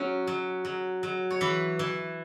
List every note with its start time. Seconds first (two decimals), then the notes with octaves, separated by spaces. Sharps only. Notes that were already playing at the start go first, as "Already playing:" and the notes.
Already playing: F#3 C#4
0.27 F#3
0.65 F#3
1.03 F#3
1.31 C#5
1.41 E3 B4
1.79 E3